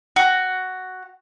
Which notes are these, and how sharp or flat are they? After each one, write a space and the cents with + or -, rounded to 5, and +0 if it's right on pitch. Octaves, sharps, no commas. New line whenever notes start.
F#4 +5